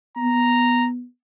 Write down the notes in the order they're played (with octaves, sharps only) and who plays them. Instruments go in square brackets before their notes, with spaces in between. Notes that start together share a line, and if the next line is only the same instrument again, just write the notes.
[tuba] B3 [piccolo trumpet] A#5